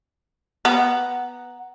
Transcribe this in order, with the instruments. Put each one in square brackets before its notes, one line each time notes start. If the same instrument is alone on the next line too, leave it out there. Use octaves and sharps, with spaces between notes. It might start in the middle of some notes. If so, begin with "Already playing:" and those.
[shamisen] B3 [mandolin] F#5 A#5